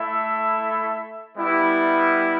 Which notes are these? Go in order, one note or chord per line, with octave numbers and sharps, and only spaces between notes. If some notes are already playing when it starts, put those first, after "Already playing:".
Already playing: A3 E4 A4 E5
G3 B3 E4